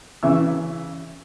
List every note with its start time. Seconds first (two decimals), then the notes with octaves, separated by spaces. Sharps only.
0.23 C#3 E3 E5 E6